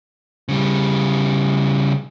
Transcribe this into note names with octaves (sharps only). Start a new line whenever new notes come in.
C#3 G3